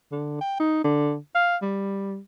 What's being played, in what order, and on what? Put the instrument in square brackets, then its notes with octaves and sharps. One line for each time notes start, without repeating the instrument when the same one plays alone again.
[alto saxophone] D3
G5
D#4
D3
F5
G3